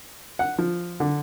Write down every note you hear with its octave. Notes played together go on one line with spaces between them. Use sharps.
F#5
F3
D3